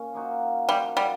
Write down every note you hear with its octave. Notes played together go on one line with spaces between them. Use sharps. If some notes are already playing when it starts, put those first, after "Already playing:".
Already playing: A#2 C#4
F3 A#3 D#4 F#4
F3 G3 A#3 D#4 F#4
G3